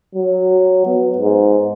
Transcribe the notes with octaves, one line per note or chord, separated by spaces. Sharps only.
F#3
B3
G#2